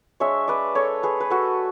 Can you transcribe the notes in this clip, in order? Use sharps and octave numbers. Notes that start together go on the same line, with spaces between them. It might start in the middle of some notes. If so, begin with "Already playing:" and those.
G#3 D4 C#5 E5
B4 D5
A4 C#5
G#4 B4
B4
F#4 A4